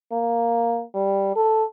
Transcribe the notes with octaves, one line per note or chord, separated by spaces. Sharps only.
A#3
G3
A4